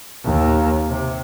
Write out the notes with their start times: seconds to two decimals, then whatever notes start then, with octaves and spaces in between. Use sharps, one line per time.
0.25 D#2
0.89 C3